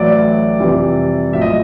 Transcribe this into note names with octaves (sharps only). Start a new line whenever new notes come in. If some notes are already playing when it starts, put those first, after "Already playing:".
Already playing: A1 A2 F#3 D5
F2 C3 E3 G3
A#1 A2 F#3 E5
D#5